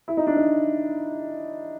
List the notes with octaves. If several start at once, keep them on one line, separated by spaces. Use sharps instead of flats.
E4
D#4
D4
D#4